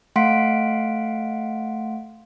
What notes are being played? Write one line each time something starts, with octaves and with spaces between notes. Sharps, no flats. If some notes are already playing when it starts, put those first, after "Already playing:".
A3 F5 F#5 C6 B6 D7